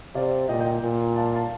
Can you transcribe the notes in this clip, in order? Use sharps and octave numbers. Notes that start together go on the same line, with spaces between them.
C3 D5 F5
A#2 D#5 G5
D#5 G5
A#2
F5 A5
F5 A5